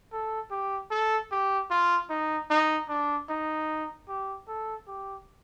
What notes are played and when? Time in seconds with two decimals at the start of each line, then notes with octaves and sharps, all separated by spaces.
0.12 A4
0.51 G4
0.91 A4
1.31 G4
1.71 F4
2.09 D#4
2.50 D#4
2.89 D4
3.29 D#4
4.08 G4
4.48 A4
4.87 G4